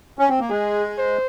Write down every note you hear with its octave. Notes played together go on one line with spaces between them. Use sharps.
C#4
C4
A#3
G#3 G#4
C5